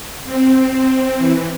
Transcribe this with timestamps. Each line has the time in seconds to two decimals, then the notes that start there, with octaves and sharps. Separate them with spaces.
0.24 C4
0.74 C4
1.17 E3